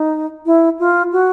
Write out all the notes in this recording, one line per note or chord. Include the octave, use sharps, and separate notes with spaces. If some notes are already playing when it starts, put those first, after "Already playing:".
Already playing: D#4
E4
F4
F#4